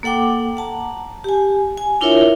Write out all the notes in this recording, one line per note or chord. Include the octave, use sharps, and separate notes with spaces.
A#3 A4 F#5 G5 D6
F#5 A5 A#5
G4 G#5
G#5
D4 E4 F4 A#4 C#5 E5